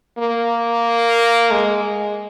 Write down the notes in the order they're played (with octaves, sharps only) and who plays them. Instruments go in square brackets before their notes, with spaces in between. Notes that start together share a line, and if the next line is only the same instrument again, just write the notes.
[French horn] A#3
G#3
G#3